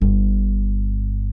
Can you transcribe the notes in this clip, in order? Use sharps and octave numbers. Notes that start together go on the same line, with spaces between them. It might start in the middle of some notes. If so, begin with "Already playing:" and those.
G1